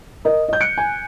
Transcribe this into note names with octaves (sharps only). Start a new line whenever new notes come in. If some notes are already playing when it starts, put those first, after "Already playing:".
A#4 D#5
D#5 G6
F#6 C#7 D7
G#5